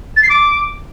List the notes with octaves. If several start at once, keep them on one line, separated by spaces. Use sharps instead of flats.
A6
C7
D6